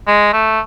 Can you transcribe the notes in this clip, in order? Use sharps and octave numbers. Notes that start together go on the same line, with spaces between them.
G#3
A3